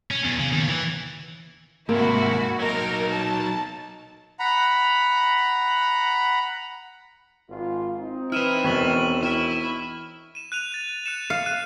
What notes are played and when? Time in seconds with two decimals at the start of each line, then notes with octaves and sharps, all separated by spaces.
0.11 C#4
0.24 E2
0.39 C#3
0.52 D#2
0.68 E3
1.89 G#2 C3 A#3 E4 F#4
2.59 F#3 D#4 A#4
3.11 A5
4.39 F#5 A#5 B5
7.49 G#1 G#2 F4
8.00 C4 D#4
8.32 E4 B4 F6 D#7 E7
8.64 E1 C#6 B6 F#7
9.23 E4 F6
10.35 D#7 E7
10.52 F#6 D#7 F7
10.72 F#6 A6
11.06 F#6 C#7 E7
11.30 F5 C#7
11.46 F#6 D#7